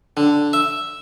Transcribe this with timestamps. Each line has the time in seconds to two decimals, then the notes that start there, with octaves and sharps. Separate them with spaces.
0.17 D3
0.53 E5